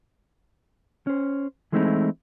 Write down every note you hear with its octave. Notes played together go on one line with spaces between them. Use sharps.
C#4 C5
E3 G#3 A3 C4 D#4 E4